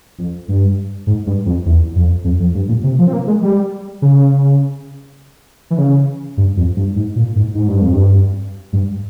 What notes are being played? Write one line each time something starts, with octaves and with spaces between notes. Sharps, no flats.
F2
G2
G#2
G2
F2
E2
F2
F2
F2
G2
A#2
C3
F3
C4
A#3
G#3
G3
C#3
E3
C#3
G2
F2
G2
G#2
A#2
G#2
G#2
G2
F2
G2
G2